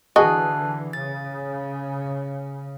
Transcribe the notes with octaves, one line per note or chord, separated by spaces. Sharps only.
D3 E3 F#4 G#4 D#5 A5 C#6 F#6
C#3 A6